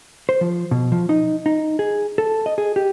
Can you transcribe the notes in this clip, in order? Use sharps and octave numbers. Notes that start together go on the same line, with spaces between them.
C5
F3
B2
F3
D#4
D#4
G#4
A4
D#5
G#4
G4